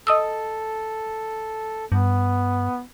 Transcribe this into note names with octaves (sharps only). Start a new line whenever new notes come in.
A4 D#5 D#6 E6
G2 B3